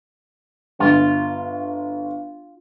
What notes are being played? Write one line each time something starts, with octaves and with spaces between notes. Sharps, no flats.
G1 F4